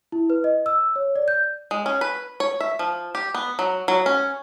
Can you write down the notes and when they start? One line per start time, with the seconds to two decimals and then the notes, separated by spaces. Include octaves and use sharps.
0.12 E4
0.30 B4
0.44 D#5
0.66 E6
0.96 C#5
1.16 D5
1.28 G6
1.71 G#3
1.86 C#4
2.01 B4
2.40 C#5
2.60 E5
2.79 F3
3.15 G4
3.34 B3
3.59 F#3
3.88 F#3
4.06 C#4